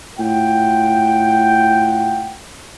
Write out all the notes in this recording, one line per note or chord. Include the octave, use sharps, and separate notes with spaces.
A2 F4 F#5 G5